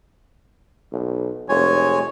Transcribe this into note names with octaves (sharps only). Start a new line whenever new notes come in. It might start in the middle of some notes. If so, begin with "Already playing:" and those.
B1
F1 G#3 C#5 G#5